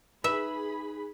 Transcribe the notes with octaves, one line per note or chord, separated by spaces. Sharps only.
D#4 G#4 B4 E5 B5